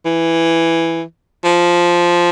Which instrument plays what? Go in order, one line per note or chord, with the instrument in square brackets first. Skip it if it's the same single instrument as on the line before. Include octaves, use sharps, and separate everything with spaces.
[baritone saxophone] E3
F3